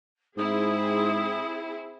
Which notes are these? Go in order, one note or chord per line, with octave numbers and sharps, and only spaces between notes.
G#2 C4 E4 G#4 D#6